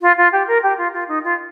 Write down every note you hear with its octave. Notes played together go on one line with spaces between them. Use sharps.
F4
F4
G4
A#4
G4
F4
F4
D#4
F4